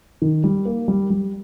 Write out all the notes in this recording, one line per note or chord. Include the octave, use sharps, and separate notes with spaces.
D#3
G3
A#3
G3
G3